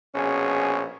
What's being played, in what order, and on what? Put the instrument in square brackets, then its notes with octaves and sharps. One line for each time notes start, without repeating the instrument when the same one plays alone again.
[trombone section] A#1 B2 G#4 [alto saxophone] C#4